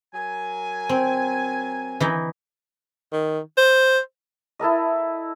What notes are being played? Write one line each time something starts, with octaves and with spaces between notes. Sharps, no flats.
F#3 A#4 G#5
C4
E3 D#4 E4
D#3
C5
E4 A4 A#4 D#5